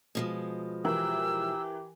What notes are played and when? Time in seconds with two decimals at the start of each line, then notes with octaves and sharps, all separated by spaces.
0.15 B2 F3 G#3
0.85 E3 G4 A#4 E6